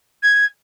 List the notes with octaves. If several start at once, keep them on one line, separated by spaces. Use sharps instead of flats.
G#6